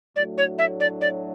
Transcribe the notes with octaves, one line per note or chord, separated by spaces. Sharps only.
A2 F#3 A3 D4 F#4 D5
C#5
E5
D5
D5